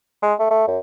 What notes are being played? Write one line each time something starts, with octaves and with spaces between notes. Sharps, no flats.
G#3
A3
A3
F#2